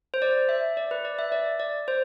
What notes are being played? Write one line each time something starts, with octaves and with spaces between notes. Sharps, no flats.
C5
D5
E5
D5
B4
D5
E5
D5
D5
C5